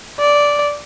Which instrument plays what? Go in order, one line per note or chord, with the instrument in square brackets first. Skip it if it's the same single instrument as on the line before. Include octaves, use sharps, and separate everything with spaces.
[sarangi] D5